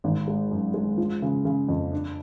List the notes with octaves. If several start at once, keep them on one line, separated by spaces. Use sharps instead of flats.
G#1
G#3
F#2
G#3
F3
C#3
C#3
F2
D4